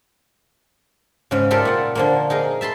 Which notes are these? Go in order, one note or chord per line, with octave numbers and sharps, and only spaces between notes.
G#2 C#3
F4 G4 A4 A#4 D5 E5
A#2 F#5
D3 F3 A#3
D#4 G#4 A#4
E5 A5 B5 C6